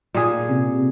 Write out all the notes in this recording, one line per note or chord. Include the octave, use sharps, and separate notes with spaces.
A#2 G#4
C3